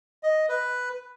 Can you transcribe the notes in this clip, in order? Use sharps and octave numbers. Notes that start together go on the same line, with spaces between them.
D#5
B4